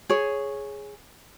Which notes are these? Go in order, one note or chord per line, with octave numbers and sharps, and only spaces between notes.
G#4 C#5